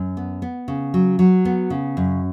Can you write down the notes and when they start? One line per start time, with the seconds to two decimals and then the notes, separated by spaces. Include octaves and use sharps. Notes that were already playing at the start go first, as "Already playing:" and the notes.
Already playing: F#2
0.17 B3
0.42 B3
0.68 C#3
0.94 F#3
1.19 F#3
1.45 B3
1.70 C#3
1.97 F#2